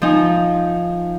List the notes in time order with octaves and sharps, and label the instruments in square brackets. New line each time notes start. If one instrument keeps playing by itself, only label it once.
[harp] F3 D#4 G#5